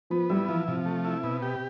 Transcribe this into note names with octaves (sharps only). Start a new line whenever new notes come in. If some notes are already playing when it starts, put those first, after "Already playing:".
F3 B3
G3 E4
E3 F3
C3 F3
A3
E4
B2
G4